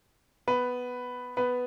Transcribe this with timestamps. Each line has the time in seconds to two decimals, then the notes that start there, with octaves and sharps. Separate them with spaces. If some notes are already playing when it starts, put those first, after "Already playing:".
0.48 B3 B4
1.37 B3 B4